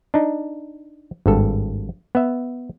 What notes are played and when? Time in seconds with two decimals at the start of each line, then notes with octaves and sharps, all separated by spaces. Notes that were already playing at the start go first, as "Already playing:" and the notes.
0.14 D4 D#4
1.26 G#1 G2 A4
2.15 B3 E5